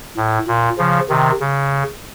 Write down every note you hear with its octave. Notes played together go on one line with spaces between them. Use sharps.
A2
A#2
C#3 F3
C3 D#3
C#3